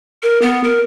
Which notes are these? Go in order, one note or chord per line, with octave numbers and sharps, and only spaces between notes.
A#4
B3
A#4